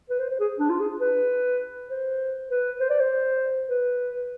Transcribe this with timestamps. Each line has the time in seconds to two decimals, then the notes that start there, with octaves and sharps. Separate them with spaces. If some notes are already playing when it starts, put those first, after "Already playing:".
0.10 B4
0.20 C5
0.30 C5
0.40 G#4
0.60 D4
0.70 F4
0.80 G#4
1.00 B4
1.90 C5
2.50 B4
2.80 C5
2.90 D5
3.00 C5
3.70 B4